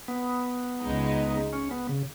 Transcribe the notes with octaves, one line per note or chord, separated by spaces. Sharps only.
B3
C#2 C#3 G#3 D#4
C#4
B3
C#3